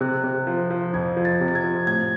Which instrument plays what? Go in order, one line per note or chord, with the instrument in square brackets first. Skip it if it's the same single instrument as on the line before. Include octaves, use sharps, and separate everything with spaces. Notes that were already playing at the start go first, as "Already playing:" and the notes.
[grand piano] C3 [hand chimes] F#6
[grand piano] C3
F3
F3
[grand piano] F2 [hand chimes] G#6
[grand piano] F3
[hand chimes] A6
[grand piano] C3
[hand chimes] A6
G#6
[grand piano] F3
[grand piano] A2 [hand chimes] G#6